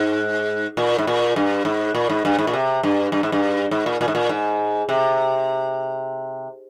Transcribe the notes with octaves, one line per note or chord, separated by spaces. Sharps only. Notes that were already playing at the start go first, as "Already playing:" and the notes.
Already playing: G#2
A#2
G#2
A#2
G2
G#2
A#2
G#2
G2
G#2
A#2
C3
G2
G2
G#2
G2
G#2
A#2
A#2
G#2
A#2
G#2
C3